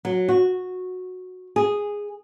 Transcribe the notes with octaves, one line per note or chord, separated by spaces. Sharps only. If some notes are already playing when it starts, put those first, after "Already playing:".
F#3
F#4
G#4